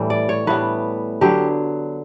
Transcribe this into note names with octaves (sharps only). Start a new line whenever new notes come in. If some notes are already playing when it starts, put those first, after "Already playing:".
Already playing: A2 E3 G3
D5
C#5
A2 G3 B3 B4
D3 F#3 B3 G4